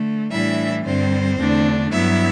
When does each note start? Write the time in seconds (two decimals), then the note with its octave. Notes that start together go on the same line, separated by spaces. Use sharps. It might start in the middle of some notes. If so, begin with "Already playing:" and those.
Already playing: D3 A3
0.32 A2 E3 G3 D4 E4 E5
0.85 G2 D3 G3 C4 C5
1.39 E2 D3 A3 D4
1.92 G2 F#3 B3 E4 E5